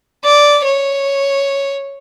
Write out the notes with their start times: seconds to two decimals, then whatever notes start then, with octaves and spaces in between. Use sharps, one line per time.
0.24 D5
0.65 C#5